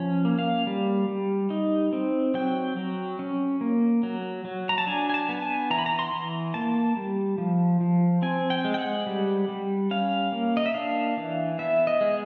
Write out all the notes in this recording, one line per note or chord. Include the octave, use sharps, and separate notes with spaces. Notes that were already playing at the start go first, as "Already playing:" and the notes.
Already playing: F3 C#4
A#3
F5
G3
G3
D#4
C4
F#3 G5
F#3
C#4
A#3
F#3
F#3
A#5
A5
D4 G#5
G#5
A5
B3
G#5
E3 A#5
B5
A#5
C6
E3
A#3 A5
G3
F3
F3
C4 G#5
G5
G#3
G5
F#5
G3
G3
C#4 F5
A#3
D#5
E5
D4 F5
E3
B3 E5
D#5
G#3